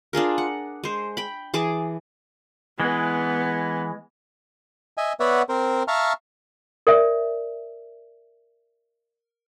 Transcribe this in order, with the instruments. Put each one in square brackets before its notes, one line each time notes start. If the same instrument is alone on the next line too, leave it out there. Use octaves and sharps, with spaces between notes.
[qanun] D4 F4 G#4 A#4
F#5
G#3 C5
G5 B5
E3 G#4 A5 D6
[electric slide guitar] E3 G#3 [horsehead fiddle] B3
[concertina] D#5 E5 G#5
B3 B4 C#5 D5 E5 F#5
C4 A#4 C5
E5 F5 A5 A#5 C#6 F6
[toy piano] A#4 D5 E5